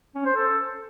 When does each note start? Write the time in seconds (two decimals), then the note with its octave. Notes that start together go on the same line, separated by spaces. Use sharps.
0.15 C#4
0.25 C5
0.36 A4